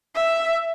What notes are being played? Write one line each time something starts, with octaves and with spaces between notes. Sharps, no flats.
E5